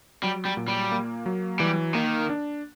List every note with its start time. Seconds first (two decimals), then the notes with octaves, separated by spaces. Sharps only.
0.22 F#3 G3
0.45 G3
0.57 A#2
0.68 G3
0.92 A#3
1.26 F#3
1.60 E3 G3
1.94 D#3 A#3
2.29 D4